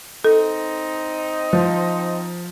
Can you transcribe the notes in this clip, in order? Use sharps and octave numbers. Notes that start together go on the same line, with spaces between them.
C4 D#4 A4
F3